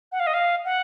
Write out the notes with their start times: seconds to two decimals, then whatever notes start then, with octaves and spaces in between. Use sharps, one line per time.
0.12 F#5
0.20 F5
0.27 D#5
0.34 F5
0.65 F#5